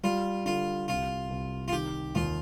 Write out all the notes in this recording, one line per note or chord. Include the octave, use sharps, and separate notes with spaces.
G3 F4
D3 F4
C2 F4
C2
F4
D#3 G4
D#2 F4